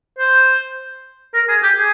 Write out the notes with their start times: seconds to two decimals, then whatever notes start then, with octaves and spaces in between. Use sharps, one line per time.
0.18 C5
1.34 A#4
1.48 G#4
1.63 G4
1.77 G#4